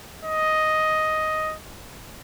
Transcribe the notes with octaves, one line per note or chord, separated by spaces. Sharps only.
D#5